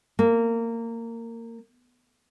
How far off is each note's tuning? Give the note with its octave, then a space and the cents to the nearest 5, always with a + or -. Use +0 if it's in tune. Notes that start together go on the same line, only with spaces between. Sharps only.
A#3 -20